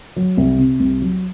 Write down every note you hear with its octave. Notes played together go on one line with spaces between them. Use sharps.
F#3
C2
C3
C2
F#3